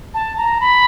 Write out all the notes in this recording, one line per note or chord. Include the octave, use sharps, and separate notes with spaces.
A5
A#5
B5